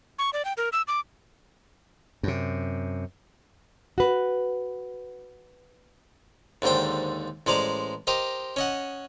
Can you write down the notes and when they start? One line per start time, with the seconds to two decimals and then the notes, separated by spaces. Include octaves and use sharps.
0.19 C#6
0.33 D5
0.45 G5
0.57 A#4
0.73 E6
0.88 D6
2.23 F#2 C3
3.98 F#4 B4
6.62 D#2 G#2 D3 C5 G5
7.46 A1 G#3 C5 D5 A#5
8.07 G4 A#4 C5 D#5
8.56 C#4 D#5 F#5